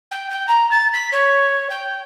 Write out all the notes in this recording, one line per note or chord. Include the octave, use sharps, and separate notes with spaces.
G5
G5
A#5
A6
B6
C#5
G5